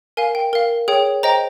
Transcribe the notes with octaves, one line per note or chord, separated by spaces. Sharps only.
A#4 F5 G#5
G5
A#4 F5
G#4 C#5 G5
C5 D#5 G5 A#5